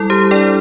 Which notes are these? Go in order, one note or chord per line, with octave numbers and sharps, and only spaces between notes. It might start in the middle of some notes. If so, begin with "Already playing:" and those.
Already playing: G3 E4 A4
G4 C5
D4 A4 D5